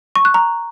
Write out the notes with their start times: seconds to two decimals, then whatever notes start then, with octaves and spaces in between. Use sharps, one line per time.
0.16 C#6
0.25 F#6
0.34 A#5